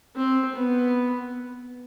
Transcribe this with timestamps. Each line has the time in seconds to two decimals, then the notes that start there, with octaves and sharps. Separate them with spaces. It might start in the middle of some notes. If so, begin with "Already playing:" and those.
0.16 C4
0.55 B3